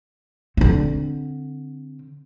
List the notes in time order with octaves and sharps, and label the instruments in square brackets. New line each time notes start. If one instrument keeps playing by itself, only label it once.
[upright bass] D3 C4